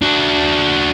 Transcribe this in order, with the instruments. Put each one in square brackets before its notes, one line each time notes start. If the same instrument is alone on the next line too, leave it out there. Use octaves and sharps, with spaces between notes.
[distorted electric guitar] D4 F#4